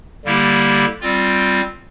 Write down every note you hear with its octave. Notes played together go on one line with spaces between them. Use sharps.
D3 G3 A#3 E4 G4
G3 C4 F4